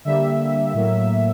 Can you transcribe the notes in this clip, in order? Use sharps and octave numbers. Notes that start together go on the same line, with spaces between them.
D3 G3 A#3 E5
A2 F#3 A#3